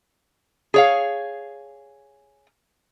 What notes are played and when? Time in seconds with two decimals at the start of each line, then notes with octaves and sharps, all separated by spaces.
0.74 G#4 C#5 F5